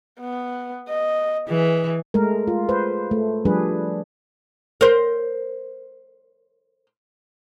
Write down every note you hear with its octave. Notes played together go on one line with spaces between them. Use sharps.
B3
D#5
E3 G#4
G#3 A3 A#4
F4
B4 C5
A3
F3 G3 D4 G#4 B4
A#4 C5